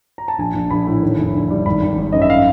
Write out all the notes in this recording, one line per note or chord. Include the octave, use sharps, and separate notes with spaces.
A#5
A5
A#1 G#5
A#1
A#1 B5
A2
D#2
F1
D3
G3
G#1 B5
G#1
G#1
F#2 D#5
E5
F5